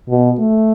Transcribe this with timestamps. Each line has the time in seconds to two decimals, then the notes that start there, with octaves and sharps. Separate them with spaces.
0.09 B2
0.39 A3